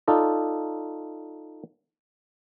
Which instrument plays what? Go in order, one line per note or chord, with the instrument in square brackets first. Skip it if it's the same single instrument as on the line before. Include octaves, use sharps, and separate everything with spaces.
[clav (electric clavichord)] D#4 F4 A4 D5